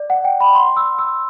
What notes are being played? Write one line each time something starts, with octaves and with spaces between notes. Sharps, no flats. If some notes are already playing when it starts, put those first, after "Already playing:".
Already playing: D5
F#5
G5
B5
C6
E6
E6